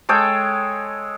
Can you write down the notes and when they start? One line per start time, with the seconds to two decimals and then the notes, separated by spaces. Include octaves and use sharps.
0.09 G#3 A4 C#5 G5